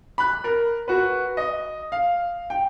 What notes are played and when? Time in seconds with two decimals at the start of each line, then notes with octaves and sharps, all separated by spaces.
0.18 B5 F#6
0.44 A#4
0.88 F#4 B4
1.37 D#5
1.92 F5
2.50 G5